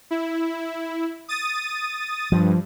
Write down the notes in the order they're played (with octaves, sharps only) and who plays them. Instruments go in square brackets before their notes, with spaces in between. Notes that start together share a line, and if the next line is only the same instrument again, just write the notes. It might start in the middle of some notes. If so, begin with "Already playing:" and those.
[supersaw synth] E4
D#6 A6 D#7
[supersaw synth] G2 [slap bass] F3